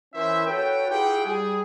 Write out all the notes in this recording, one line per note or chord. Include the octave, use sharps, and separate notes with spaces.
E3 C#4 E4 A#4 C5 E5
F#4 A4 B4 C#5 G5
E4 F4 G4 G#4 F#5 G5
G3 G#4